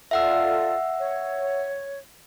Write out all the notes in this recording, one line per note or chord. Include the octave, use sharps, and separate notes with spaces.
F4 A4 D5 E5 F#5 E6
C#5